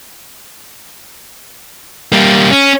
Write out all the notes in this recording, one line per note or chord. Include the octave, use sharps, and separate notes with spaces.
G3 A#3
C#4